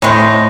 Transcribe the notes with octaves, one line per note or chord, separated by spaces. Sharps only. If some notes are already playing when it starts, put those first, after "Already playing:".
A2 D#3 G#3 C4 D#4